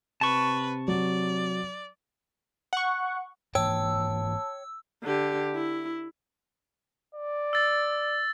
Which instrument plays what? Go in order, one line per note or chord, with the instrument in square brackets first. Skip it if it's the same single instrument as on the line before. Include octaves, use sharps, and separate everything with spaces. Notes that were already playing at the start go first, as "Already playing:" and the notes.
[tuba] C3 [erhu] B4 [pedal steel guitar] A5 C#6
[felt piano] F#3 [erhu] D5
[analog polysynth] F#5 C#6
[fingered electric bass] G#2 E3 A#3 [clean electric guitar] C#5 G5 [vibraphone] A5 [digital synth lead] E6
[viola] D3 G4
E4
[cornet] D5
[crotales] E6 A6